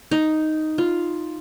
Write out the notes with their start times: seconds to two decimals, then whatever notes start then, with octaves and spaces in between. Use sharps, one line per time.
0.11 D#4
0.78 F4